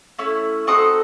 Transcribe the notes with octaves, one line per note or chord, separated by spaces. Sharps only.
A3 C#4 E4
C4 D#4 F#4 A4 C#6 D#6